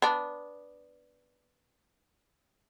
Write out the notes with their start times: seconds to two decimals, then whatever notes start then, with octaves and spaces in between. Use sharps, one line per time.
0.02 B3 D4